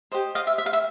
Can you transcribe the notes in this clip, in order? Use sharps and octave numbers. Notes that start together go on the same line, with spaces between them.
G4 C5 D#5
D#5 F5
E5
E5
F5
E5